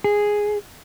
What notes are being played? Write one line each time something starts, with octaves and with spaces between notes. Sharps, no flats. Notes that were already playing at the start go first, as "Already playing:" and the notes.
G#4